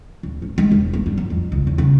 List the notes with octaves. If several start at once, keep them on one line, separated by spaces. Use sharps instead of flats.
D1
C#4
G#3
E1
A#3
G2
F#2
F2
C#2
E2
C#3